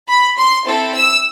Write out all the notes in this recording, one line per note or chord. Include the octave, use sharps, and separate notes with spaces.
B5
C6
C4 E4 A4
E6